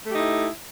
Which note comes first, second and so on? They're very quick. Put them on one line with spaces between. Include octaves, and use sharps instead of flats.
A3 G4 D#4 E4